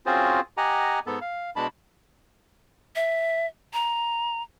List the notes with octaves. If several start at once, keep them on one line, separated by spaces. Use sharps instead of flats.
C4 C#4 F4 F#4 G#4 C5
G4 D#5 F#5 G#5 A#5
G#2 B3 A4
F5
B2 G#3 D4 A5 B5
E5
A#5